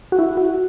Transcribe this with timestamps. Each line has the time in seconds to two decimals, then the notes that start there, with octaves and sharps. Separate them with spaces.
0.12 F#4
0.19 E4
0.37 F#4